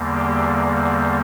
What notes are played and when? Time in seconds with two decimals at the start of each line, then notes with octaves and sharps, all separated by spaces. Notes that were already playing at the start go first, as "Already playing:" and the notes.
Already playing: E2 D3 G3 A#3
0.15 G4